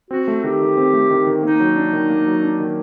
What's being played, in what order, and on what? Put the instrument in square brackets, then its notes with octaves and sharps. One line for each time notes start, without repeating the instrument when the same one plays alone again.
[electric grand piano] C4 [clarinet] F#4
[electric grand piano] A3
[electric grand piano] D#3 [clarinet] G4
[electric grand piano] D#3
C4
A3
D#3
D#3
[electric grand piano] A#3 [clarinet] D#4
[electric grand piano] F#3
D4
D#3
A#3
F#3
D4
D#3